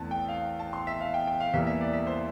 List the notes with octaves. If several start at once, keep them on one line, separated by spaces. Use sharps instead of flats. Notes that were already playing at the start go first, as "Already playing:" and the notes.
Already playing: E2 E3 A3 C4 A5
G5
F5
A5
C6
E5
F5
G5
G5
F5
E2 E3 G3 A#3 E5
E5
D5
E5
C5